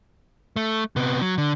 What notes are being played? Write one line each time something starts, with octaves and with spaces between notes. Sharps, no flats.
A3
C3 B3
F#3
D3